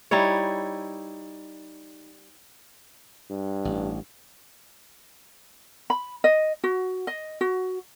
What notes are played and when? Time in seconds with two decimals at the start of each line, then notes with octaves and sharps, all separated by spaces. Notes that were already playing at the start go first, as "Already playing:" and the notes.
0.11 G3 D#4 E4 C#5
3.31 G2
3.65 A1
5.90 B5
6.24 D#5
6.64 F#4
7.07 D#5
7.41 F#4